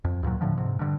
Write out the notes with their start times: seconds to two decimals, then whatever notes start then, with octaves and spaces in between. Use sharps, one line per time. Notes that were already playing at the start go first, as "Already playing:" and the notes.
0.04 F2
0.23 D2 G2 A#2 F#3
0.41 A2 D3 F3
0.58 G#2 C3
0.79 G2 D3